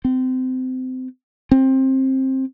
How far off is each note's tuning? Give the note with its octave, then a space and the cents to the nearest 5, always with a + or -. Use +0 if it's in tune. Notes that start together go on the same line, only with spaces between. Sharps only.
C4 -30
C4 +20